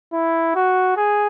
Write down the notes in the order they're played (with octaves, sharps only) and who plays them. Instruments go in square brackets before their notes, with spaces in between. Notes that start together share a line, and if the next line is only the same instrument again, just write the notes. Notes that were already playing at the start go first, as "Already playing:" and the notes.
[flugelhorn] E4
F#4
G#4